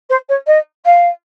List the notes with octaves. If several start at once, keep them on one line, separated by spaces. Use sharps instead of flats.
C5
C#5
D#5
F5